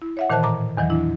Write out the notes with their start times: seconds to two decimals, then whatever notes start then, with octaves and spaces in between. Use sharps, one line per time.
0.02 E4
0.17 C#5 E5 F#5
0.30 A#2 D#3 E3 C5 A5 F#6
0.43 A2 A#5 D6
0.77 E2 D#3 E3 F#3
0.90 D4 E4